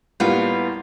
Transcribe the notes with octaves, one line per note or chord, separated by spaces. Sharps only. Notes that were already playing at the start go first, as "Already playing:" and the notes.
A2 G3 A#3 B3 F4